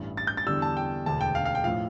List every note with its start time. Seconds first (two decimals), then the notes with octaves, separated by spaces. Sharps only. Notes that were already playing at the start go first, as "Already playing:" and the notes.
Already playing: A1 G2 E3
0.17 A6
0.27 G6
0.37 A6
0.46 E2 D3 G3 E6
0.62 A5
0.77 G5
1.06 E1 D2 D3 A5
1.21 G5
1.35 F5
1.45 F5
1.55 G5
1.64 A2 F3 F5